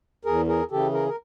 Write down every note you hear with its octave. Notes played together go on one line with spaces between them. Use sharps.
E2 G#4 A#4
G#4 A#4
C#3 E3 G4 A4
G#4 A#4
A#4